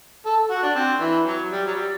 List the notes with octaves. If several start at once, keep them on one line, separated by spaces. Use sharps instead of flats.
A4
F#4
D4
C4
E3
F#3
G3
F#3
G3